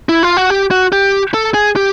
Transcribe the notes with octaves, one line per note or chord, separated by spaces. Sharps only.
E4
F4
F#4
G4
F#4
G4
A4
G#4
G4